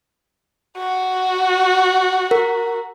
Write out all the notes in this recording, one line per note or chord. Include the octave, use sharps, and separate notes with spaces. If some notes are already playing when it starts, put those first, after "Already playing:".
F#4
A#4